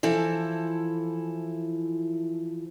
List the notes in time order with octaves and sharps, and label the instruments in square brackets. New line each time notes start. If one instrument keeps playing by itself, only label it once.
[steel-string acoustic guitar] E3 F3 E4 A4